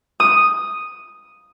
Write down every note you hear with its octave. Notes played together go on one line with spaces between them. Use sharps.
D#6